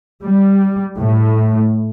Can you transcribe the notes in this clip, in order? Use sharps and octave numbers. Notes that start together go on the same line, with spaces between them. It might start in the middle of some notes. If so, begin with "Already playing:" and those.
G3
A2